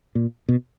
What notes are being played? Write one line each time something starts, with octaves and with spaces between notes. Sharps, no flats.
A#2
B2